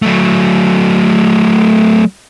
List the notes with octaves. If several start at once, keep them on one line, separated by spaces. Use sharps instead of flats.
F#3 A3